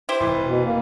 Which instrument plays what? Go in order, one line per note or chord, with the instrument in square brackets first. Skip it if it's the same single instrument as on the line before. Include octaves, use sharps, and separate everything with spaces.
[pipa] E4 G4 C5
[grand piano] F1 E3
[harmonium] B2
A#3